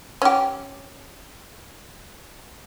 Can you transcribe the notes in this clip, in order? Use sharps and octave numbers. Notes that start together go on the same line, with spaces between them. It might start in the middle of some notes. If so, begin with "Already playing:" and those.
C#4 G4